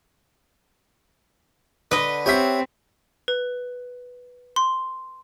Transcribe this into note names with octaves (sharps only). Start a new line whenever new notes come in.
D3 B4 D#5
C4 G4 C#5 E5 F#5 G6 B6
B4
C6